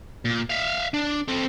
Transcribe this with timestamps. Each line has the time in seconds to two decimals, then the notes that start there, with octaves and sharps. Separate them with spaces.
0.25 A#2
0.50 E5 F5
0.94 D4
1.28 C4 A4